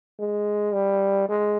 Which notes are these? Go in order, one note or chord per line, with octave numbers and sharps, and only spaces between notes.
G#3
G3
G#3